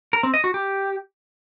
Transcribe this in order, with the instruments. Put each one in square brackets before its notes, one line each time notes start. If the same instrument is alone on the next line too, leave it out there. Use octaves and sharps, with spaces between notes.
[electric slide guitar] A#4
C4
D#5
F#4
G4